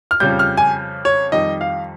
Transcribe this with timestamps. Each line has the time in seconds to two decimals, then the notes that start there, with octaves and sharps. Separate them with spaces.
0.11 F6
0.20 F2 C#3 G3 G6
0.39 F6
0.57 G#5
1.05 C#5
1.32 F2 D#3 G3 D#5
1.61 F5